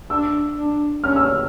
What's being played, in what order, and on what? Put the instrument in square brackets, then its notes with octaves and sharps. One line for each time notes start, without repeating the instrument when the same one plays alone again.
[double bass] D4 [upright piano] E6
[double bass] D4
[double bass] C#4 [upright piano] F6
[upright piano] E6
F6